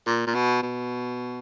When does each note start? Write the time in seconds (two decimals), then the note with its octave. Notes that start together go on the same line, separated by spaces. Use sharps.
0.07 A#2
0.27 A#2
0.35 B2
0.62 B2